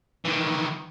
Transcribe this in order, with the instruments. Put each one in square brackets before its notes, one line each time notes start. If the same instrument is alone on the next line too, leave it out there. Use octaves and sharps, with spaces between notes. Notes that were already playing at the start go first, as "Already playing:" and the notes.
[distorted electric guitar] D#3 E3